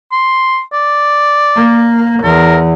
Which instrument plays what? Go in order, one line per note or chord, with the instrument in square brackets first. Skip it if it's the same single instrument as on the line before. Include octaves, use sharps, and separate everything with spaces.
[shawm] C6
D5
[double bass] A#3
[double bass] E2 [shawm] A#4